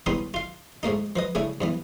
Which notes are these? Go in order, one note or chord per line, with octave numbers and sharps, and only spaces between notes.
C2 D#3 B3 C#4 D#4 C6
F4 F5
G#2 A3 A#3 D#4
F3 B4 D#5
C#3 A3 C#4 D4 E4
G2 E3 B3